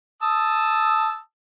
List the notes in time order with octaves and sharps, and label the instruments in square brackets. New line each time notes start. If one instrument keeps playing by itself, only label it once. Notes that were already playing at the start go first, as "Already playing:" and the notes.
[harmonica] A5 D#6 E6